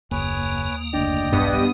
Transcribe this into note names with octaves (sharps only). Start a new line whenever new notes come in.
F#1 D#2 A#3 B4 C#5 G#5
F#1 D2 D4 D5 D#5 G5
E1 B1 G2 B3 D#6